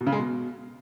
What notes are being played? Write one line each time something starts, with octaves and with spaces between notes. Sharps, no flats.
B2
C#3
G#3
B2